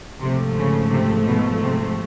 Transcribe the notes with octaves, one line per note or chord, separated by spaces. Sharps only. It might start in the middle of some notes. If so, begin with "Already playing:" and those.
G#1 G#2 C3 F3 A3
C#3
C3
B2
C3